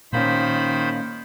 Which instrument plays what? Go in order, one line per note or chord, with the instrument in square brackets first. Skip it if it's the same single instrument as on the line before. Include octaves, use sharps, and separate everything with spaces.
[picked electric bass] A#2 A#3 C#4 [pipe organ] D#3 C5 B5